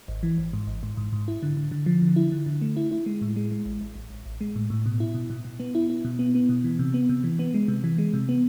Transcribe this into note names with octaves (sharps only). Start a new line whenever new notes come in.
G#1
E3
G#1
G#2
G#1
G#2
G#2
G#2
E4
D3
D3
D3
F3
D3
E4
D3
D3
A3
E4
E4
G#3
A2
G#3
G#3
A1
A1
A1
A1
A1
G#3
A2
A2
B2
E4
B2
B2
B2
B3
E4
E4
B2
B3
B3
B2
E3
C3
B3
C3
E3
B3
G#3
C3
E3
G#3
C3
B3